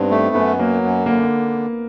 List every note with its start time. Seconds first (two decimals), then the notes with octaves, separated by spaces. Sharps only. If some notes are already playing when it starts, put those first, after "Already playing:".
Already playing: G2 B3 C4 D#4
0.11 A3
0.35 F#2 B3
0.59 F#3 A#3
0.83 F#2
1.06 D3 A#3